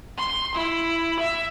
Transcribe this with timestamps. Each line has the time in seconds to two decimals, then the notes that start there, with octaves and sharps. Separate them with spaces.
0.17 C6
0.55 E4
1.20 E5